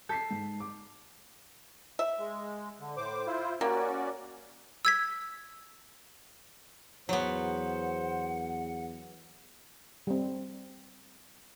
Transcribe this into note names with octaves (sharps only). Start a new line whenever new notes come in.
A4 G6 B6 C7
G#2
D6
E5
G#3
D3
A2 C5 D6
E4 F4 C5
A#3 C#4 F#4 G4 D5
E6 G#6 B6
E2 F#3 B3 C5 F#5
G3 C4